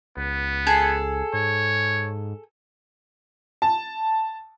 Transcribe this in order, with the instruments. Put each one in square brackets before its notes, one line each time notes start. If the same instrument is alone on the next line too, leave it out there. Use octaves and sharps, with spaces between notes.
[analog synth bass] C#2 [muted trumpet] B3
[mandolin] G#4 A4
[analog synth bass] G#2 [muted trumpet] C#5
[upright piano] A5